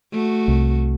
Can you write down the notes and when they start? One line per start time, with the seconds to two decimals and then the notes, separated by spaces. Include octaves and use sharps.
0.12 A3 F#4
0.48 C2